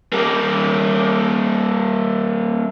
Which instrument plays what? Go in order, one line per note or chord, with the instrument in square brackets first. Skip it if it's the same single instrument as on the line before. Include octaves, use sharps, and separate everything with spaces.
[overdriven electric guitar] G3 A#3